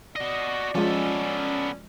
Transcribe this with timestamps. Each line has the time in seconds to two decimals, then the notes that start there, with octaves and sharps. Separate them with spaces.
0.16 F#4 D5 D#5
0.75 F3 G#3 B3 C#4 A4